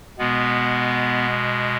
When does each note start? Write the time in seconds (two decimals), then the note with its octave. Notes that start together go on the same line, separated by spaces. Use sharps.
0.19 B2 G#3 B3